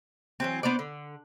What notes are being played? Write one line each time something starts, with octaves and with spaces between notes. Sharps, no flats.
E3 F#3 C4
B3 D4 C5 D5
D3